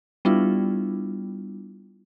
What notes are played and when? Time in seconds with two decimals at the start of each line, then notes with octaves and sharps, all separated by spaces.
0.25 G3 B3 D4 E4 F4